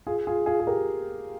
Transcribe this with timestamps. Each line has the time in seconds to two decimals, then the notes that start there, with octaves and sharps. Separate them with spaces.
0.07 F4 G#4
0.27 F4 G#4
0.46 F4 G#4
0.60 G#4
0.67 G4 A#4